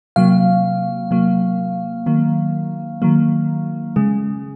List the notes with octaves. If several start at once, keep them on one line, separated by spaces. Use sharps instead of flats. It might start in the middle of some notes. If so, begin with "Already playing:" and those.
C3 F#3 A#3 F5
C3 F#3 A#3
D#3 F#3 A#3
D#3 F#3 A#3
C#3 G#3